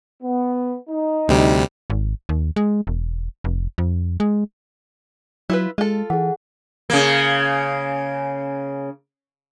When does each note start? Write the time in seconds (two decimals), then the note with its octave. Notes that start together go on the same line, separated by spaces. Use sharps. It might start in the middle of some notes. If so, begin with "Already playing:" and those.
0.23 B3
0.89 D#4
1.28 D2 C3 G3
1.90 G#1
2.29 D#2
2.56 G#3
2.87 E1
3.44 F1
3.78 F2
4.20 G#3
5.50 F#3 E4 F4 B4
5.78 G#3 F4 A4
6.10 E3 G#4 F#5
6.90 C#3 A#3